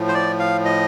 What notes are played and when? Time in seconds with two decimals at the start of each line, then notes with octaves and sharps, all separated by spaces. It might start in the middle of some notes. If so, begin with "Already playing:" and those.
Already playing: A2 F3
0.08 C5
0.14 D5
0.39 F5
0.65 D#5